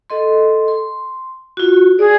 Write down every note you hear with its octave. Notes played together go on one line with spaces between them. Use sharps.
A4 D#5 C6
C6
F4 F#4
G#4 D5